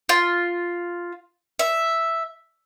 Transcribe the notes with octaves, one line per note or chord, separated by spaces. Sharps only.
F4
E5